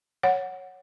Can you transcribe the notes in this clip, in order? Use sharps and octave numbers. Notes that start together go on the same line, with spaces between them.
C#5 F#5